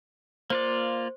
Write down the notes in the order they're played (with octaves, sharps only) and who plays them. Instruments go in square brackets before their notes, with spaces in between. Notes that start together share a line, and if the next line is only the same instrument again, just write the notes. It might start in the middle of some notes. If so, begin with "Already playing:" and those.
[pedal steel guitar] A#3 F4 D5 [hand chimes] C5